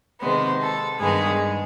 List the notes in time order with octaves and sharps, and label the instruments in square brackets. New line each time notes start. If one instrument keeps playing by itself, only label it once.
[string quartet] C3 D#3 G#3 B3 C5
A4
G2 D#3 G#3 B3 G#4